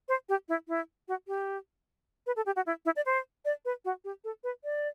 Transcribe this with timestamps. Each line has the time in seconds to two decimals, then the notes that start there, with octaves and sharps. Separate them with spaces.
0.09 C5
0.29 G4
0.49 E4
0.68 E4
1.08 F#4
1.28 G4
2.27 B4
2.36 A4
2.46 G4
2.56 F#4
2.66 E4
2.85 E4
2.96 D5
3.06 C5
3.45 D5
3.65 B4
3.85 F#4
4.04 G4
4.24 A4
4.44 B4
4.64 D5